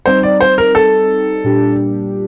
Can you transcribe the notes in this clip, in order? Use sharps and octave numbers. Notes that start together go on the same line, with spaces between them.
G3 C4 D#4 C5
D5
C5
A#4
A4
A#2 G3 D4 G4